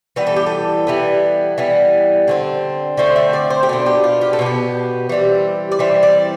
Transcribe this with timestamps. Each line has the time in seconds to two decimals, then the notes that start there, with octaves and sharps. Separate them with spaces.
0.16 E3 G3 B3 B4
0.27 A4
0.36 G4
0.46 A4
0.87 E3 G3 B3
1.58 E3 G3 B3
2.28 D3 A3 C4
2.98 D3 A3 C4 C5
3.16 E5
3.33 D5
3.50 C5
3.63 G4
3.69 B2 B3 D4 A4
3.86 G4
4.04 F4
4.21 G4
4.33 A4
4.39 B2 B3 D4
4.46 G4
5.09 E3 G3 C4
5.72 D5
5.79 E3 G3 C4 E5
6.03 D5